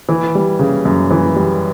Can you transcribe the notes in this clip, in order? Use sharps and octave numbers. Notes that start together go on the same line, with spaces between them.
E3
G3
C#3
F#2
E3
G3